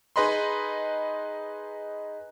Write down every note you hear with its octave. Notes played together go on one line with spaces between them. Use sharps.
D#4 G#4 B4 D#5 B5 C6